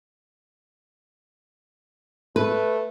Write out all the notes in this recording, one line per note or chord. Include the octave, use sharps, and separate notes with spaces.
A3 B4